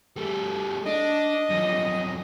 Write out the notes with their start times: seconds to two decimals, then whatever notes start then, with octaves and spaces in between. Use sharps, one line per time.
0.17 G3 A3
0.86 D4 D#5
1.49 F#2 F3